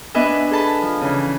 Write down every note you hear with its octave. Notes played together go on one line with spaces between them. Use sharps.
B3 D4 B4 D#5 E5 G#5
G#4 A4 A5 B5
F3
C#3 E3